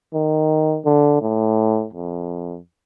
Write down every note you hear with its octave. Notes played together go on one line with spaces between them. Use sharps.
D#3
D3
A2
F2